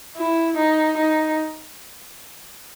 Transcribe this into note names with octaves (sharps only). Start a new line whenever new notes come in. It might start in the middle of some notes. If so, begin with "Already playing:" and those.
E4
D#4
D#4